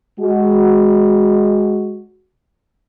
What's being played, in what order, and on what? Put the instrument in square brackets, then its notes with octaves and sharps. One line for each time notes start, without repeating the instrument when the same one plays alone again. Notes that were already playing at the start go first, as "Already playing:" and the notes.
[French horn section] G#3 F#4